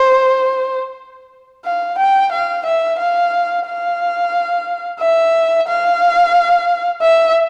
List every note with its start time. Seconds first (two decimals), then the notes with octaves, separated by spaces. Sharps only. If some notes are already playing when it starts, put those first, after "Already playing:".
Already playing: C5
1.65 F5
1.98 G5
2.32 F5
2.66 E5
2.99 F5
3.66 F5
5.00 E5
5.67 F5
7.02 E5